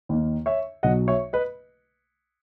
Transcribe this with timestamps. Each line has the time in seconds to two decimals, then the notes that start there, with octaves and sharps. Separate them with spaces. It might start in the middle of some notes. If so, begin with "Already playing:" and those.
0.09 D#2 D#3 A#3
0.46 C#5 E5
0.83 B1 B2 F#3 D#5 F#5
1.08 C#5 E5
1.33 B4 D#5